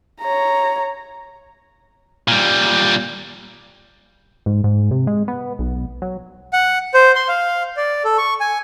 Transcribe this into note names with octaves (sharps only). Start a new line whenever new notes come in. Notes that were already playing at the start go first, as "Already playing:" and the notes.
C#5 A#5
A#2 G3
G#2
G#2
C3
G#3
B3
B1
F#3
F#5
C5
C6
F5
D5
A4
C#6
G#5